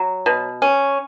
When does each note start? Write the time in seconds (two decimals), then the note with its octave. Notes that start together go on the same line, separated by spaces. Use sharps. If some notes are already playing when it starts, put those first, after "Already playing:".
Already playing: F#3
0.26 B2
0.62 C#4